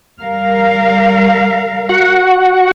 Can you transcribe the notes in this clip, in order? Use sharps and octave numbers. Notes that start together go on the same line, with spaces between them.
G3 A#4 F5
F#4 F#5